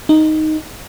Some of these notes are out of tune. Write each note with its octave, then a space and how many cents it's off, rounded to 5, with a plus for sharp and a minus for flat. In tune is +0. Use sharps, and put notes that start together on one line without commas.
D#4 +0